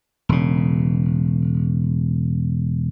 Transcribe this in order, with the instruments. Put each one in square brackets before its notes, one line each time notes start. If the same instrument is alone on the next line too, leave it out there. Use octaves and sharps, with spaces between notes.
[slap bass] E1 C#3